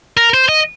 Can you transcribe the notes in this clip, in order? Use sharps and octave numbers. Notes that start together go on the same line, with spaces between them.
A#4
C5
D#5